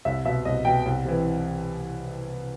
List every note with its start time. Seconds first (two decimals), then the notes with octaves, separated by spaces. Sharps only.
0.05 C2 E5
0.25 B2 E5
0.45 C2 D#5
0.65 B2 G5
0.86 C2
1.05 C3 E3